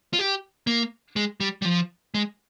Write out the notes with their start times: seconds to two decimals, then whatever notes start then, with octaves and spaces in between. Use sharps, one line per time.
0.13 F4
0.19 G4
0.67 A#3
1.16 G#3
1.40 G3
1.62 G3
1.65 F3
2.14 G#3